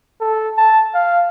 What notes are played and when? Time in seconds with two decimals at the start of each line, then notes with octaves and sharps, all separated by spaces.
0.21 A4
0.58 A5
0.95 F5